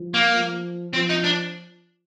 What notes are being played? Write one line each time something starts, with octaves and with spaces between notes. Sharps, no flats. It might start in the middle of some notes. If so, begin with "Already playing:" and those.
Already playing: F3
A#3
F3
F3 C4
D#4
D4